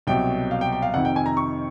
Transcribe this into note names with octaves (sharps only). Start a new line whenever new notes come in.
C2 B2 F#3 G5
F5
G5
G5
F5
F2 C3 D#3 F#5
G5
G#5
A#5
C#6